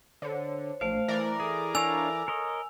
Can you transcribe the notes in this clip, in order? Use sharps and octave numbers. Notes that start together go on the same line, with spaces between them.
D3 C5 C#5
A#1 A3 C5 F5
E3 A#4 D5
G#4 A4
D4 C#5 F5 G#5 E6 F7
A#4 C#5 D#5